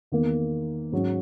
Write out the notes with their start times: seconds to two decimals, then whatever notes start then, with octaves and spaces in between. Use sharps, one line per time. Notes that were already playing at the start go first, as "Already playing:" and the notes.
0.12 E2 D#3 A#3
0.92 G#2 F#3 C#4